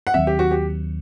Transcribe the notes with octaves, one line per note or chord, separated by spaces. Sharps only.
F#5
D#2 D#3 F#3 C4 E5
G4
F#4
G4